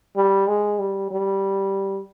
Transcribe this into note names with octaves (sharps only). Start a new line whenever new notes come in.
G3
G#3
G3
G3